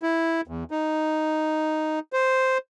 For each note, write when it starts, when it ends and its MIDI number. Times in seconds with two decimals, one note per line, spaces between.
0.03 0.41 64
0.48 0.64 40
0.71 1.99 63
2.13 2.58 72